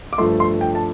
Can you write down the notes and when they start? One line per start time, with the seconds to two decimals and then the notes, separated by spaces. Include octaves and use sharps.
0.13 D6
0.18 G2 F3 A3 C6
0.40 C6
0.61 G5
0.75 A5